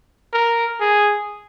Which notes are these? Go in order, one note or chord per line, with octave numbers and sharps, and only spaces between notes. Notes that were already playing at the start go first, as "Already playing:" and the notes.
A#4
G#4